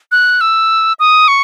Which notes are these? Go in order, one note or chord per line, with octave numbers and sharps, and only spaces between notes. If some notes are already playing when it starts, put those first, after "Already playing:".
F#6
E6
D#6
C#6